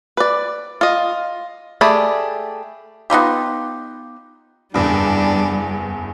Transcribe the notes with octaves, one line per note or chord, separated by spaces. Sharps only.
B4 D5
F4 D#5
A3 G4 G#4 D5 B5
B3 D#4 F4 G4
F#1 E2 G2 G3 D4